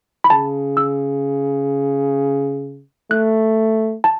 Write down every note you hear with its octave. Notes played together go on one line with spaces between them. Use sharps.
B5
C#3 A5
E6
A3 F#6
A5